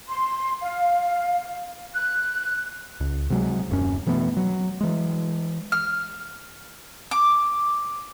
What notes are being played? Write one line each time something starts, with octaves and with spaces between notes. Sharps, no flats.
C6
F5
F#6
C#2
C3 F#3 G#3
D#1 F#2 C#4
B2 E3 A3 B3
F#3
E3 G#3
F6
D6